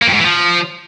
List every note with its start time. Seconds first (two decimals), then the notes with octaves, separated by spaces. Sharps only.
0.02 A#3
0.08 F2
0.14 G#2
0.19 E3
0.25 F3